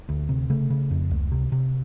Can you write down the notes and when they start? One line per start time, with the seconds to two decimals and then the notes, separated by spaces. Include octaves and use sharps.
0.09 D2
0.29 C3
0.50 C#3 A3
0.70 C#3
0.91 F2
1.11 C#2
1.32 C3
1.52 C3